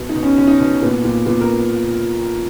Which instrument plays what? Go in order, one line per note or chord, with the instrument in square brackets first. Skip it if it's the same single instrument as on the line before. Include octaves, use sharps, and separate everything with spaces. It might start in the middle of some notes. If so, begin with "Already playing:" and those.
Already playing: [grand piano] B2
D#4
B2
C#4
B2 C#4
D#4
C#4
B2
A#2 B3
A#2
A#2 B3
A#4